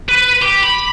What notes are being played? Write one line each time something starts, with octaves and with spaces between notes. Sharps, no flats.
B4
G4
B5